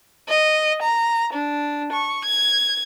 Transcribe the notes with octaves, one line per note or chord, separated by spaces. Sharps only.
D#5
A#5
D4
C#6
G#6